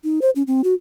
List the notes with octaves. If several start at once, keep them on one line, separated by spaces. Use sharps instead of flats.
D#4
C5
C#4
C4
F#4